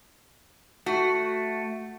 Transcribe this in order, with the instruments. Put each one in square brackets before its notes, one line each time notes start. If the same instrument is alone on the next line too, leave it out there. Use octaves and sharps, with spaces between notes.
[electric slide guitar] A3 [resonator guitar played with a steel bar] F#4